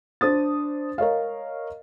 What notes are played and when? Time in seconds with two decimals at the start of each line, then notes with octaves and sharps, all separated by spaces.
0.21 D4 C5 D#6 A6
0.98 A#4 C#5 D#5 F5